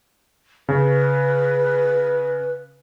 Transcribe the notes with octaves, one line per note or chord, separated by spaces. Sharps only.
C#3 B4